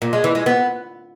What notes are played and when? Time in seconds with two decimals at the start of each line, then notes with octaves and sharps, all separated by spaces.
0.02 A#2
0.13 G#3
0.24 E3
0.35 G#3
0.46 B3